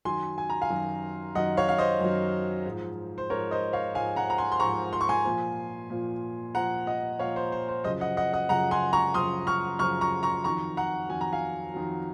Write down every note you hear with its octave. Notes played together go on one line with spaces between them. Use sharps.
F#2 D#3 F#3 G#5 C6
G#5
A#5
F5 G#5
F#2 D#3 F#3
F#2 D#3 F#3 D#5 F#5
C#5 F5
F5
C5 D#5
F#2 D#3 F#3
G#2 F3
C5
G#2 F3 A#4 C#5
C5 D#5
C#5 F5
G#2 F3 F5 G#5
F#5 A#5
A#5
G#5 C6
C6
G#2 F3 A#5 C#6
C6
C#6
G#5 C6
A#2 F3
A#2 F3
A#2 F3 F#5 A#5
D#5 F#5
A#2 F3 C#5 F5
C5
C5
C5
F#2 C#3 F3 C5 D#5
D#5 F#5
D#5 F#5
D#5 F#5
F#2 C#3 F3 F#5 A#5
G#5 C6
A#5 C#6
F#2 C#3 F3 C6 D#6
C#6 F6
F#2 C#3 F3 C#6 F6
A#5 C#6
A#5 C#6
F2 D#3 F#3 A#5 C#6
F#5 A#5
F2 D#3 F#3 G#5
A#5
F5 G#5
F2 D#3 F#3